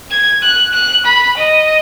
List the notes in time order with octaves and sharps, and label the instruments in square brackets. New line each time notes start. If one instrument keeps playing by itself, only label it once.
[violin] G#6
F#6
F#6
B5
D#5